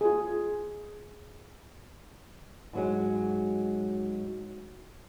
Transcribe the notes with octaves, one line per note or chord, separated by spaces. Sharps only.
F4 G#4
G#2 F#3 G#3